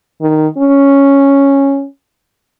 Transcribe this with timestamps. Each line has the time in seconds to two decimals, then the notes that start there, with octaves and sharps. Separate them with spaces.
0.21 D#3
0.58 C#4